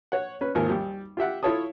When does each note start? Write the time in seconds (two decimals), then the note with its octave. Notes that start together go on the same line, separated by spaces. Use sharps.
0.12 C#5 F#5
0.41 C#4 B4
0.55 G#1 D#2 F3 A#4 G#5
0.69 G3
1.17 F4 G4 E5 F#5
1.43 E4 F4 A4 C#5 A5 D#6